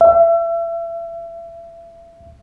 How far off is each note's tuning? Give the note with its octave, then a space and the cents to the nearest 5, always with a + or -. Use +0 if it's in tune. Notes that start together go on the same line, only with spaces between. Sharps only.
E5 +30